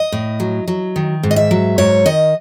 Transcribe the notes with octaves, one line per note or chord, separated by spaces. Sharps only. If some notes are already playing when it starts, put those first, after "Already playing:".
Already playing: D#5
A2
F#3
F#3
D#3
G#2
D#5
E5
F#3
G#2 C#5
D#3 D#5